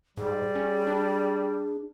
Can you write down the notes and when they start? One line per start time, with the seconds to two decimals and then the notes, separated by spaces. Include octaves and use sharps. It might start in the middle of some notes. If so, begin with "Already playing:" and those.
0.17 G#2 G3 G#4
0.55 C#4
0.87 D4